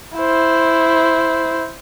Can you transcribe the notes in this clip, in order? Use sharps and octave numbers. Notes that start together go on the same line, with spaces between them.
E4 C5